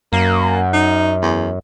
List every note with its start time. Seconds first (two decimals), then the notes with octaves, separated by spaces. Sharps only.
0.13 F#2 A#3
0.73 D#4
1.22 E2